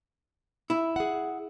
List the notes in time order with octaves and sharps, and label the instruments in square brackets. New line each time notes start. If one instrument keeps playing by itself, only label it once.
[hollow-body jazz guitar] E4
[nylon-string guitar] G#4 F#5